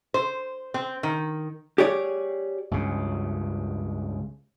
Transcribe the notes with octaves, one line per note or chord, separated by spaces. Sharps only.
C5
C4
D#3
G4 G#4 C#5 D5
C#2 G2 C#3